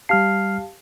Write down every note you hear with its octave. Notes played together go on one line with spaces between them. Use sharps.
G3 G4 F5 A5 F6 C7